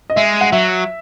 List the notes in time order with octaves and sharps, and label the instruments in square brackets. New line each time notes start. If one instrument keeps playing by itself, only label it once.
[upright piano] D#5
[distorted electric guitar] G#3 [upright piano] E5
[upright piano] F#5
[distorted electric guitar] F#3 [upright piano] E5